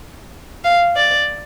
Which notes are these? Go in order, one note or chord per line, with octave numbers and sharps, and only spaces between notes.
F5
D5